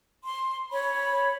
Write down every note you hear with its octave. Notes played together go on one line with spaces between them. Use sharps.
C6
C#5 B5